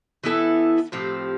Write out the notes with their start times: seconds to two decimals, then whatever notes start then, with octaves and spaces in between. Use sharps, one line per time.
0.24 E3 B3 E4 A4
0.92 A2 F3 C4 G4